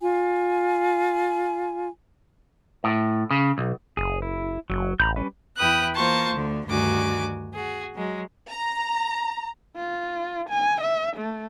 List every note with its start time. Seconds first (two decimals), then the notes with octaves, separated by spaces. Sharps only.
0.01 F4 G#5
2.84 A2
3.31 C#3
3.58 B1
3.97 F#1 G#4
4.22 E4
4.70 F#1 F#3
5.00 A1 A#5 B5 G6
5.16 G3 C#4 B4
5.57 E2 E4 B4 G5 D#6 F#6
5.95 E3 A#3 F4 C5 A5 C#6
6.34 D2 D3
6.66 D2 G2 D#3 F#4 G#5 D6
7.54 F#4 G#4
7.95 F#3 G#3
8.50 A#5
9.76 F4
10.50 G#5
10.81 E5
11.17 A3